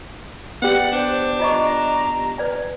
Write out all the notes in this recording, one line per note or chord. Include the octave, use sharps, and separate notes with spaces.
B3 G4 D5 F#5
D4 C5
F4 D#5 A#5 C#6
B4 D5 G#5